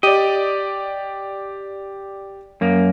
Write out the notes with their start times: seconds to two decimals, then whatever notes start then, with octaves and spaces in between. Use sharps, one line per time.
0.03 G4 D5 D#5
2.61 F#2 A#3